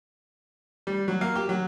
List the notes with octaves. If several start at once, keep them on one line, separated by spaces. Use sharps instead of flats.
G3
F#3
A#3
G4
F#3